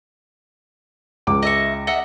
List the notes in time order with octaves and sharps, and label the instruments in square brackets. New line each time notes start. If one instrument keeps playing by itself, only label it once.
[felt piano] C#2 D6
[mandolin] D#5 E5 C#6
D#5 E5 F#5